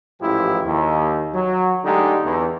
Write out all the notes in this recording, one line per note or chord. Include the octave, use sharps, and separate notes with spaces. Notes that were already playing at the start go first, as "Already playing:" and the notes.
A1 G#2 F3 E4 G4
D#2
F#3
D3 G#3 A3 D#4 G4
E2